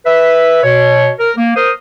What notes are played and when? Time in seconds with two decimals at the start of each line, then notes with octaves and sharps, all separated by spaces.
0.05 B4 E5
0.63 B2 C#5
1.19 A#4
1.37 A#3
1.56 A#4 C5 D#6